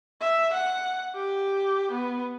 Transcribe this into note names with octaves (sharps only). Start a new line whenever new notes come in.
E5
F#5
G4
B3